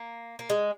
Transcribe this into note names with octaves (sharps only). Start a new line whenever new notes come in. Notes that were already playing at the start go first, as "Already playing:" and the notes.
Already playing: A#3
A#3
G#3